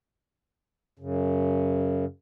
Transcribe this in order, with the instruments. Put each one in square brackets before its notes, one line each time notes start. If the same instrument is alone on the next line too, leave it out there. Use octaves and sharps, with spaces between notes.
[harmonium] F#2 C#3